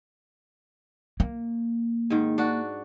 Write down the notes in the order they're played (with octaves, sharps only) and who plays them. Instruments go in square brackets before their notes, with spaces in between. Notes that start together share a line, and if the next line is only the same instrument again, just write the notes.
[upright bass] A#3
[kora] G#2 D#3
D4 F#4